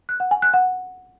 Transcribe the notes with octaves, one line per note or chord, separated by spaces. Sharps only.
F#6
F#5
G#5
F#6
F#5